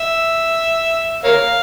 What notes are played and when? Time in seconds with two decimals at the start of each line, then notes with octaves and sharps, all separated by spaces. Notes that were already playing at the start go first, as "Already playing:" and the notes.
Already playing: E5
1.24 A#4 C#5 F5